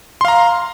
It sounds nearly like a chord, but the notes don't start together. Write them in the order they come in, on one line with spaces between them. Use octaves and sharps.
C6 F5 A#5